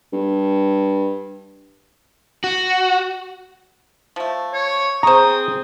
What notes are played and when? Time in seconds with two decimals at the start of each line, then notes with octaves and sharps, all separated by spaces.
0.13 G2
2.44 F#4
4.16 F3 A3
4.53 C#5
5.03 C4 G#4 C5 A#5 C#6 D#6